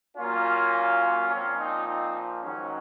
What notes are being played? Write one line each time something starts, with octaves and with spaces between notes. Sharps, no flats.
A#2 F#3 A#3 C#4 F4
A#2 F3 C4 C#4
C4 D#4
C4 D#4
G#2 D#3 F#3 C#4